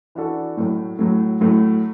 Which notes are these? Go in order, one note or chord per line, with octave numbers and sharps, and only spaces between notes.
E3 D4 F#4 A4
A2 F#3 A3
A2 F#3 A3
A2 F#3 A3